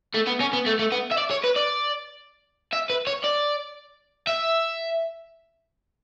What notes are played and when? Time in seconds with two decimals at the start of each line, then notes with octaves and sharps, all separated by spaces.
0.15 A3
0.27 B3
0.41 C#4
0.53 B3
0.66 A3
0.79 A3
0.92 B3
1.12 E5
1.18 D5
1.31 C#5
1.44 B4
1.56 D5
2.73 E5
2.90 B4
3.07 C#5
3.24 D5
4.27 E5